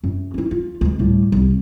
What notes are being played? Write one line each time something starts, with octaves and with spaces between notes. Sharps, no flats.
F#2
C#4 E4
F4
D2 G#3
A2 G3
E1 C2